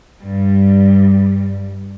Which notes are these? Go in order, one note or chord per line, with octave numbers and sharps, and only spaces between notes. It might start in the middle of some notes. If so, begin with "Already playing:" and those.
G2 G3